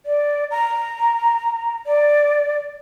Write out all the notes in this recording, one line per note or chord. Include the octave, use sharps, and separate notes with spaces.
D5
A#5
D5